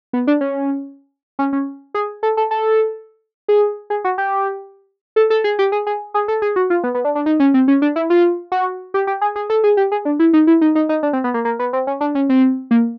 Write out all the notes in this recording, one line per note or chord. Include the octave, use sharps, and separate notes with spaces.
B3
D4
C#4
C#4
C#4
G#4
A4
A4
A4
G#4
G#4
F#4
G4
A4
A4
G#4
G4
G#4
G#4
G#4
A4
G#4
F#4
F4
B3
B3
D4
D4
D#4
C#4
C4
C#4
D4
E4
F4
F#4
G4
G4
G#4
G#4
A4
G#4
G4
G#4
D4
E4
D#4
E4
D#4
D#4
D#4
D4
C4
B3
A#3
A#3
B3
C4
C#4
D4
C#4
C4
A#3